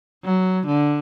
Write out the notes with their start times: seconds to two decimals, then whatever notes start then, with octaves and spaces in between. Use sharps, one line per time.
0.24 F#3
0.67 D3